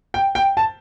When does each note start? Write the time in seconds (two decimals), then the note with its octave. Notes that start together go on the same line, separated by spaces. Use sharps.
0.14 G5
0.35 G5
0.57 A5